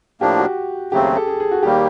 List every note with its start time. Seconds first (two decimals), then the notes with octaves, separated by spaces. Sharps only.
0.21 A2 F3 A#3 D4 G4
0.38 F#4
0.92 D#2 C#3 F#3 A3 C4 G4
1.04 G#4
1.16 A4
1.28 G#4
1.40 G#4
1.51 F#4
1.63 D#2 D#3 G3 A#3 G4